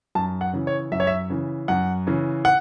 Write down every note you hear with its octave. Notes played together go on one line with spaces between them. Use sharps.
F#2 A5
F#5
C#3 E3
C#5
F#2 E5
C#5
E5
C#3 E3
F#2 F#5
C#3 E3
F#5